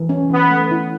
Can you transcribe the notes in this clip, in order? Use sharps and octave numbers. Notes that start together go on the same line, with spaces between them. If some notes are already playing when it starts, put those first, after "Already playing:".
Already playing: E3
C#4
E3 B3
A3
E4